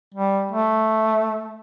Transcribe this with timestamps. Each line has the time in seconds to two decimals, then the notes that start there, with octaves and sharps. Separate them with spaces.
0.14 G3
0.52 A3